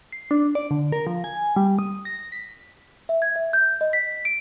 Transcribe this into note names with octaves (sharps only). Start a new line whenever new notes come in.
C7
D4
D5
D3
A#4
F3
G#5
G3
D#6
A#6
A#6
B6
E5
G#6
E5
G6
D#5
B6
D7